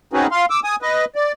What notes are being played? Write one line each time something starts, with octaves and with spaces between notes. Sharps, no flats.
C4 C#4 D#4 F#4 G#4 B4
F5 C6
D6 E6
G#5 D#6
B4 D#5
D5